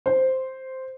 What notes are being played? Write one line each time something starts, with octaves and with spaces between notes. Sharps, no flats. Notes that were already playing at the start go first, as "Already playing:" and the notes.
C5